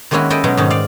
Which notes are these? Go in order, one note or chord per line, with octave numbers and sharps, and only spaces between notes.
D#3 G#3 A#3 C#4 E4 F#4
E4 A4 D#5 G5
B2 F#3 G#3 D#4
G#2 D#3 C#4 D#4
D5 F5